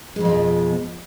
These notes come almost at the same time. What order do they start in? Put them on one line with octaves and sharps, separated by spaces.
G#3 F2 B2 F3